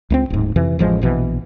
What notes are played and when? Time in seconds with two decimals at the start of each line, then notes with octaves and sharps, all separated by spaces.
0.10 C#2 A#3 C4
0.30 D1 G#2
0.56 F2 C3 E3
0.79 A1 F3 G#3
1.02 A#1 B2 E3